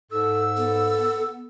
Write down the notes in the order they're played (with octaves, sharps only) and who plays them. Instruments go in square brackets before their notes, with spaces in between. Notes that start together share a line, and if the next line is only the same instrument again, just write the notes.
[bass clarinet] G#2 [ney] A4 [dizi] E6
[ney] B3 [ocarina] A4